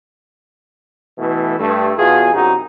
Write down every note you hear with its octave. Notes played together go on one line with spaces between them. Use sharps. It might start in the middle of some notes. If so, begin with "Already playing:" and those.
B2 E3 A3
G2 A3
E2 B2 F4 G#4
C2 F#2 C3 F#3 D#4